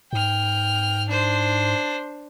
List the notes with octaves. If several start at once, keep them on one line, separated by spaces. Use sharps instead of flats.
G#2 G5 F6
D4 C5